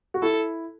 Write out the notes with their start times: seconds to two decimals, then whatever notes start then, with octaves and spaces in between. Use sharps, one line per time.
0.14 F#4
0.22 E4 A4